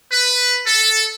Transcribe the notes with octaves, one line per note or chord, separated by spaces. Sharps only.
B4
A4